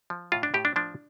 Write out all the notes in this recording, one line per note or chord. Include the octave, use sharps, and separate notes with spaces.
F3
A2 F4
D4
A2 G4
D4
F3 D4